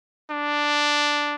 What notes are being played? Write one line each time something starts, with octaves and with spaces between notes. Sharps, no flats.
D4